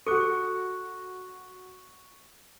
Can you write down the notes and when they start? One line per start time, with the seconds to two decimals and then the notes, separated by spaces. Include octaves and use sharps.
0.07 F#4 A4 C#6 D6 F#6 C#7